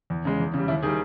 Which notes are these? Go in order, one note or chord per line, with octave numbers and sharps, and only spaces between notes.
E2
C#3 G#3
E2
C#3 G3
D#2 E4
D#3 G3 G#4